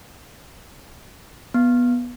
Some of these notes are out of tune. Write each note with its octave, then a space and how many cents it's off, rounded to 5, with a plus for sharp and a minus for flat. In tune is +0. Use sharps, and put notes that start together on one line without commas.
B3 -15